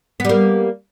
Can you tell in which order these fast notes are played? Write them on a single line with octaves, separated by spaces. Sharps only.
B3 G3 A#3